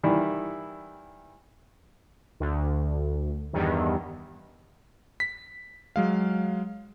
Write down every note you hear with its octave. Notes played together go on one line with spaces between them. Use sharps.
D#3 E3 G3 E4
D2
E2 G2 D#3
B6
F#3 G#3 F5